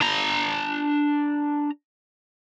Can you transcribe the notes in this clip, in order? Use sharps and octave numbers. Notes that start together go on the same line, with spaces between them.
D4 A#5